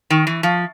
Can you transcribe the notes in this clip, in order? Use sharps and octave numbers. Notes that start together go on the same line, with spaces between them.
D#3
E3
F3